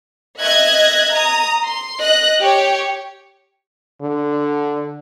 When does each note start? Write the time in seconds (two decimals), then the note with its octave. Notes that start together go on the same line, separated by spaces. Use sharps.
0.40 D#5 E5 F#6 G#6 A#6
1.13 A#5 D#6
1.65 C6
1.99 D#5 F#6 A#6
2.40 G4 C#5
4.02 D3